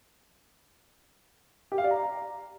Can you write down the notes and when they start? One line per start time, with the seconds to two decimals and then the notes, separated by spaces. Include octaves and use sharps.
1.72 G4
1.78 F5
1.84 D5
1.91 A#5